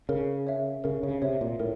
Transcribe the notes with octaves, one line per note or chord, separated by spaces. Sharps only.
C#3 A#4
C#5 E5
C#3 A#4
C#3
C3 C#5 E5
A#2
A2 A#4